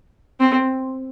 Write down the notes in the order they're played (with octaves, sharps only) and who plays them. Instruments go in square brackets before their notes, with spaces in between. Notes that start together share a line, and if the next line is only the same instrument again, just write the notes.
[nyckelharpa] C4